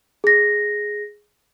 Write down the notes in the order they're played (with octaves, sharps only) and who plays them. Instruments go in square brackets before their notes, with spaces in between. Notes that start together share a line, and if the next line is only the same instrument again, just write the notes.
[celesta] G#4 A#6